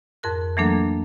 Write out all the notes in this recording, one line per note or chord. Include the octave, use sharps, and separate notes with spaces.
F2 G#2 A#4 F#6
E3 F#3 A3 A#3 D4 A4